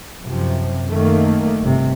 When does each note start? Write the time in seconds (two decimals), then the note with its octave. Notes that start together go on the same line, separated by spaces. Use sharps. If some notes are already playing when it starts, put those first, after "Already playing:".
0.23 F#2 C3 F3
0.88 F#2 D#3 A3 A#3
1.60 G1 C3